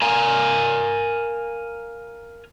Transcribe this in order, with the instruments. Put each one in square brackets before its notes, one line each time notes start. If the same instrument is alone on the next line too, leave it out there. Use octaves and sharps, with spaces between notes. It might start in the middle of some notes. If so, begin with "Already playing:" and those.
[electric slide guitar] A#4 F5 G#5 A#5